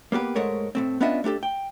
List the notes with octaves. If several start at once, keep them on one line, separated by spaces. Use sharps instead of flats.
A#3 B3 G4 B4
G#2 G#3 A3 A#4 C#5
A2 A3 C4
B3 C#4 D4 F4 D#5 E5
A3 D4 G4 A4
G5